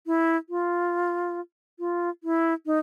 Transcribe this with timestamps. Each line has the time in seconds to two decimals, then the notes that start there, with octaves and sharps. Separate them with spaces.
0.07 E4
0.49 F4
1.79 F4
2.24 E4
2.66 D#4